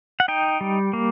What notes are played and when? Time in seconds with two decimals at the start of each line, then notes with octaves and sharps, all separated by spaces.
0.20 F#5
0.28 D#4 G5
0.61 G3
0.93 A#3